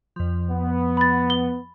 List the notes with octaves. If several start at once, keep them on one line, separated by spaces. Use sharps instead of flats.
F2 F3
B3
B5 A6
G7